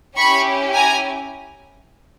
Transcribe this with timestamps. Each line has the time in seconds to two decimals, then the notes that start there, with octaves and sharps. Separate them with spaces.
0.17 C#4 E4 G4 B5 C#6
0.74 G#5 A#5